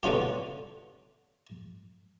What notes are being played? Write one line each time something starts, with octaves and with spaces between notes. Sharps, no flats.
B2 D3 C#4 F4 G4